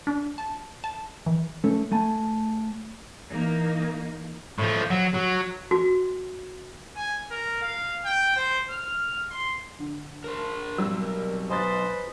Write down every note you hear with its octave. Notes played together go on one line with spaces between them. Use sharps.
D4
A5
A5
E3
A3 C#4 A4
A3 G#5 A5
E3 A#3 D#4
A2 F3
F#3
F#3
F#4
G#5
A#4
F5
G5
C5
F6
C6
D3
A#4 C5
B2 F#3 G3 C4 E6
A#4
B4 C5 D#5 G#5 C6 A6